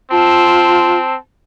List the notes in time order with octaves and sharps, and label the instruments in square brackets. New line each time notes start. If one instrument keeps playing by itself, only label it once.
[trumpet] C4 [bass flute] F4 [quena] A5